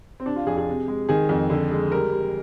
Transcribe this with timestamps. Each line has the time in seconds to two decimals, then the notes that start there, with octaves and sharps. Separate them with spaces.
0.20 C4
0.26 C3 D4
0.36 F4
0.46 F2 G#4
0.57 G#4
0.68 C3
0.88 G#3
1.09 D#3 G#4
1.29 F2
1.50 D3
1.71 G#3
1.92 G3 A#4
2.12 G3